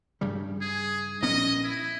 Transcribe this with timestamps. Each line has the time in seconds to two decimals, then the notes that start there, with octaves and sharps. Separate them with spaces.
0.21 G2 C#3 G3
0.61 G#4
1.22 A#1 B3 C#4 D#5
1.64 E4